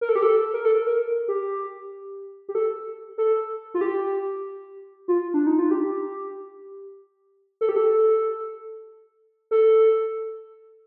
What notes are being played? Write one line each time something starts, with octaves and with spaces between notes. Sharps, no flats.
A#4
A4
G4
A4
A#4
A4
A#4
G4
G4
A4
A4
F4
G4
F4
D4
D#4
F4
G4
A4
G4
A4
A4